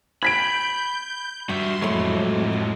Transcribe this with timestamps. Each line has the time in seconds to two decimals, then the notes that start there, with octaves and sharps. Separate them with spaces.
0.23 B5 G6 G#6 B6 D7
1.49 G2 F#4 E5 C6
1.82 F2 A2 F#3 G#3 A3 E4